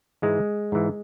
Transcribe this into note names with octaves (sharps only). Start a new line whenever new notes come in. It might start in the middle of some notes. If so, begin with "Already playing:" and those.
G#2 E3 G#3
G#2 E3